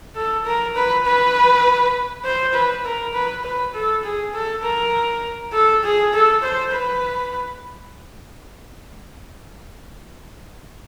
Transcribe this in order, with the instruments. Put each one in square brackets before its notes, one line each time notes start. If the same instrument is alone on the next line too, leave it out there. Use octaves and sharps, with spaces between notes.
[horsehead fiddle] A4
A#4
B4
B4
C5
B4
A#4
B4
B4
A4
G#4
A4
A#4
A4
G#4
A4
C5
B4